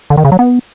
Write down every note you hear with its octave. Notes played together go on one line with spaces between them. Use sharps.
D3
D#3
C#3
F#3
B3